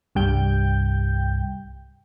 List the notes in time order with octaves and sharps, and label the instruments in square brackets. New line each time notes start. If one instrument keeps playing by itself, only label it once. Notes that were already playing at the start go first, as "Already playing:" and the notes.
[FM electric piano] C2 G2 G3 G5 G6